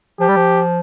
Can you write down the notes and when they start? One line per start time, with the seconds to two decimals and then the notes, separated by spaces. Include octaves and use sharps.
0.20 F3 G4
0.29 G3
0.36 F3